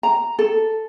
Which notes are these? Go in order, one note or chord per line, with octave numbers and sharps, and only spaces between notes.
A#5
A4